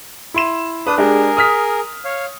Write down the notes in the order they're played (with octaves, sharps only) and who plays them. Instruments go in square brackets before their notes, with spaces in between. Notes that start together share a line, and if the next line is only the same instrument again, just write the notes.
[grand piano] E4 C6 E7
[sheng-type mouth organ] D4 D#6 [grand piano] B4
[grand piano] G#3 D4 G4 [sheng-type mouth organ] G#4 A#4
[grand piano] D#6 F6 B6
[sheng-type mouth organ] C#5 F5